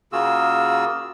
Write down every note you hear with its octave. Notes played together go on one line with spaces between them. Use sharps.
C#3 A#3 F4 F#4 G#4 E6